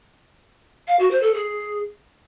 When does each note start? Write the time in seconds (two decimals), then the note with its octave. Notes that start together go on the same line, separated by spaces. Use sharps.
0.88 F5
0.99 F#4
1.11 C5
1.23 A4
1.34 G#4